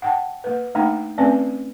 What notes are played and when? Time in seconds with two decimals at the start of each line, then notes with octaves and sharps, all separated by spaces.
0.02 F#5 G5 A5
0.44 A#3 B4
0.75 A3 A#3 D4 D#4 G5 A#5
1.18 A3 C4 C#4 B4 D5 G#5